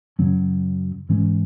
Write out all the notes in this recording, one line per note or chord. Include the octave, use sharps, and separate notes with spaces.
F#2 C#3 F#3 C#4
G#2 E3 G#3 C#4